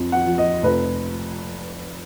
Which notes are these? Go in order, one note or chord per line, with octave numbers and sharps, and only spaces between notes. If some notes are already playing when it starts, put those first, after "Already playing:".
Already playing: F2
F#5
F3
D#5
F1 B4